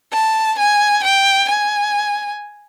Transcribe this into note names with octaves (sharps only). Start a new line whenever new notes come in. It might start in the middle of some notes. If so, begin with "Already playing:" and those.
A5
G#5
G5
G#5